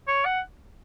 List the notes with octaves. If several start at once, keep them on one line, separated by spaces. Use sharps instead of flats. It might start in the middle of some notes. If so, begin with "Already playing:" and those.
C#5
F#5